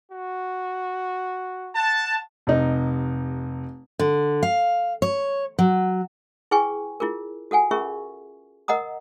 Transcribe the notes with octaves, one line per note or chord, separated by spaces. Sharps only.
F#4
F#5 A5
F1 C3 D#4
D3
F5
C#5
F#3
E4 G#4 B4 G5 G#5 C#6
E4 F4 G#4 A#4
F#4 A4 F#5 G#5
C#4 F4 G#4 A#4 E5 C#6
A#4 D#5 F#5 A#5 D#6